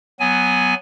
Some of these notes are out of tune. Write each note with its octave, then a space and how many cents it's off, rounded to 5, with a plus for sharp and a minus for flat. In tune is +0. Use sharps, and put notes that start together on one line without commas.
F#3 +0 B3 +0 G#5 +0